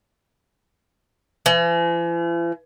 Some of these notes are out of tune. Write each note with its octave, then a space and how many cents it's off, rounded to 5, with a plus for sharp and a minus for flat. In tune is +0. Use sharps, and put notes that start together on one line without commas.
E3 +45